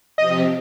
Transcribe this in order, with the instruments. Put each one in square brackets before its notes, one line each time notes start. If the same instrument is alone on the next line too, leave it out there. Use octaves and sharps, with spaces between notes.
[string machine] C3 F3 C4 G4 [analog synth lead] D#5